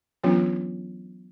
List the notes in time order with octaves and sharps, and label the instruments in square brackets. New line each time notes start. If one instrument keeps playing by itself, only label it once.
[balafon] E3 F#3 B3 C#4 D4 F4